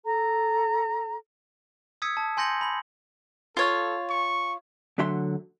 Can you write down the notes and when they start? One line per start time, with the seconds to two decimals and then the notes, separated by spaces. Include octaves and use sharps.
0.04 A4 A#5
2.02 D#6 E6 G#6 B6 C#7 D#7
2.17 A5
2.37 G#5 C6 G6 A#6 C#7 F#7
2.61 B5 F#7
3.57 F4 A4 C#5 F5
4.10 C#6
4.98 D2 D3 F#3 E5 C6